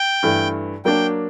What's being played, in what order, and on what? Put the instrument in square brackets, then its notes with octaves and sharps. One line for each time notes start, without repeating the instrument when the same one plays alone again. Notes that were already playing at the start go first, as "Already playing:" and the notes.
Already playing: [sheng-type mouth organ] G5
[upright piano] G2 E3 A3
[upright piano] F#3 A#3 D4 [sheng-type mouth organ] G5